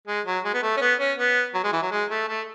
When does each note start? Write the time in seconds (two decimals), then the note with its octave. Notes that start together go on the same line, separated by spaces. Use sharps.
0.08 G#3
0.27 F#3
0.45 G#3
0.54 B3
0.63 A3
0.77 C#4
0.82 B3
1.00 C#4
1.18 B3
1.55 F#3
1.64 G#3
1.73 E3
1.83 F#3
1.92 G#3
2.10 A3
2.29 A3